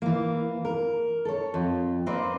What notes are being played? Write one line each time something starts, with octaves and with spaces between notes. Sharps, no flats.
E3 A#3
A#4
A4 C#5
F2
A#3 C4 B4 C5 D5